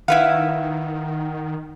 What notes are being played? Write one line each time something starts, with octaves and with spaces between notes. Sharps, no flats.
D#3 E4 B4 F5 F#5